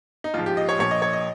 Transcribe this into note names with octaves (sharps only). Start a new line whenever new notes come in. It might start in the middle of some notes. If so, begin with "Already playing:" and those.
D#4
A#1 G#2 F3 F4
G4
D#5
C#5
A#1 A#2 F3 C#5
D#5
C#5
D#5